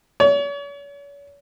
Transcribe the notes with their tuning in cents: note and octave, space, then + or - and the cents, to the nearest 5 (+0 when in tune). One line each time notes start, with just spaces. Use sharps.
C#5 +40